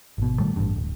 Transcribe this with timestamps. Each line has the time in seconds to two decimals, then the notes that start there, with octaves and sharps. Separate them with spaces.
0.18 G#1 B2
0.39 A2 D#3 G3 A3
0.56 A1 G2
0.76 D1